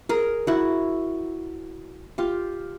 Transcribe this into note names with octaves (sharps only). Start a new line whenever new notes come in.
G#4 A#4
E4 F#4
F4 G4